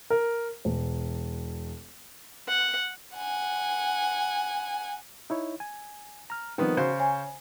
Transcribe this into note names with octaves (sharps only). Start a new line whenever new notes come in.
A#4
E1
F#5
F#5 G#5
D#4 E4 C#5
G#5
A#5 F6
D#3 F3 G3 B3 C4
C#3 F#4 C5
C#5 G#5